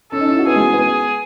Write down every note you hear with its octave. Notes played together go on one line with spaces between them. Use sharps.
C#4 A4
D#4
E4
F#4
B3 G#4
G#3
B3